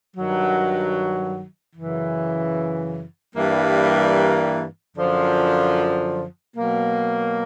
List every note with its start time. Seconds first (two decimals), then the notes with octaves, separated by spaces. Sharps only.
0.17 G2 D#3 F#3
1.76 F#2 C#3 E3
3.36 G2 E3 G3 A#3
4.96 F#2 D3 F3
6.56 B2 F#3 A#3